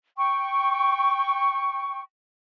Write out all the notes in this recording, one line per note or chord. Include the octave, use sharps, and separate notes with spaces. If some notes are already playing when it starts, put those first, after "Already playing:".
G5 C#6